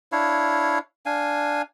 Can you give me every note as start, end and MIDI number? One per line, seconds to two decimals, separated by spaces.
0.12 0.79 62
0.12 0.79 64
0.12 0.79 73
0.12 0.79 77
1.06 1.62 62
1.06 1.62 77
1.06 1.62 80